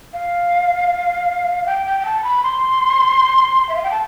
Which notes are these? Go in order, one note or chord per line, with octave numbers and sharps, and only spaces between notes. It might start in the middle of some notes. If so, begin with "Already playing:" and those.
F5
G5
G5
G5
A5
B5
C6
E5
F5
G5
A5